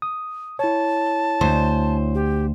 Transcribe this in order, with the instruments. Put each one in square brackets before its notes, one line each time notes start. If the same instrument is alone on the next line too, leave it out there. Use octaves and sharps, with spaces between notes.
[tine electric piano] D#6
[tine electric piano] E4 C#5 [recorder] A5
[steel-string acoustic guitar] D2 C5
[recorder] G4